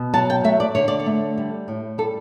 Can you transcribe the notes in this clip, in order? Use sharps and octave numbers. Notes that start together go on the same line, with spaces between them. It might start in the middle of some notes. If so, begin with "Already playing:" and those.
Already playing: B2
F#3 A5
G5
A3 E5
D5
D3 C#5
D5
C#5
A3
G3
A2
G3 A4